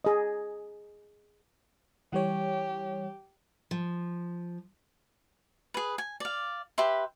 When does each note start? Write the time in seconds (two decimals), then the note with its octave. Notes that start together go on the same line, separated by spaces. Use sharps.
0.05 G#4 D#5
2.13 E3 G3 G4 C#5
3.71 F3
5.74 G#4 B4
5.98 G#5
6.20 D5 F5
6.78 G4 B4 E5 C6